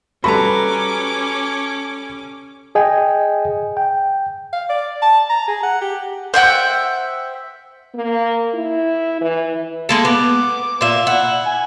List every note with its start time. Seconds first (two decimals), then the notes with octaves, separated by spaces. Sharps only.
0.24 G3 C#4 F#4 A4 B4 A#5 B5 D6
2.75 G#4 D#5 G5 G#5
3.77 G5
4.53 F5
4.69 D5
5.02 A5
5.29 A#5
5.47 G#4
5.63 F#5
5.81 G4
6.34 C5 E5 F#5 G5
7.94 A#3
8.54 E4
9.21 E3
9.89 G#3 A#3 A4
10.05 B3 D6
10.81 A#2 F4 E5
11.07 E4 F#5
11.46 G#5